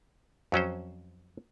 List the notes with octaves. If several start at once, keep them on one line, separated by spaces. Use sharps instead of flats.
F2 F#3 C#4 C5